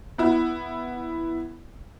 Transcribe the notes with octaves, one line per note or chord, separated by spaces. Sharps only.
B3 E4